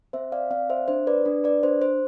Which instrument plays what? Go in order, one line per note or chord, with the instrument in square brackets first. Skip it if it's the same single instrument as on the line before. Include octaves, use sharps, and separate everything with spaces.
[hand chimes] C4 C5 E5
D5 F5
C4 D5 F5
C5 E5
D4 C5
B4 D5
D4 B4
B4 D5
D4 C5
C5